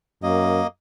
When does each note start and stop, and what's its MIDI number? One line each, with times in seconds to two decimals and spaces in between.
0.23 0.61 42
0.23 0.67 58
0.23 0.67 75